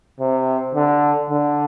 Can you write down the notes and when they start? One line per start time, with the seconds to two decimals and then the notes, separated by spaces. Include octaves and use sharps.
0.20 C3
0.75 D3
1.30 D3